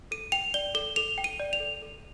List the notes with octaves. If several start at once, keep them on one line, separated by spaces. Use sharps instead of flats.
A4 D#7
G5 F7
D5 G7
A4 G7
A4 F7
G5
D#7
D5
F7
A4
A4